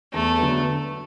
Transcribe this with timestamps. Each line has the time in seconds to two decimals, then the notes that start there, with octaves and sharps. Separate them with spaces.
0.13 E2 A3
0.39 D3 F#3 B3